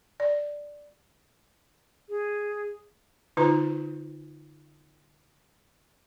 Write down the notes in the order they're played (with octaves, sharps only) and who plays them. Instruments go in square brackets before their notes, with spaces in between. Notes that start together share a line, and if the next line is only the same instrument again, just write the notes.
[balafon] D5
[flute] G#4
[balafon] D3 D#4 F4 B4 A#5 C6